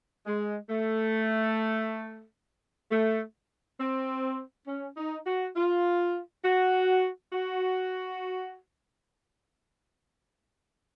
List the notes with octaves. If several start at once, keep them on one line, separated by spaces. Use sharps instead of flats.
G#3
A3
A3
C4
C#4
D#4
F#4
F4
F#4
F#4